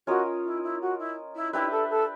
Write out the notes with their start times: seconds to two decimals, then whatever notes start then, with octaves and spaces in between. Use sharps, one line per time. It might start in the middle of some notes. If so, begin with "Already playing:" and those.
0.07 C#4 F4 F#4 A#4 D#5
0.45 E4
0.63 E4
0.81 F#4
0.98 E4
1.35 E4
1.53 D4 E4 G4 B4 E5
1.71 A4
1.89 A4